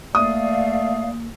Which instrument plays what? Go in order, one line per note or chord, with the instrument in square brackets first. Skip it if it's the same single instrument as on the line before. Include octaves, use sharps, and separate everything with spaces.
[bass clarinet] A3 [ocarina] A#3 [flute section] D5 F5 [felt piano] D#6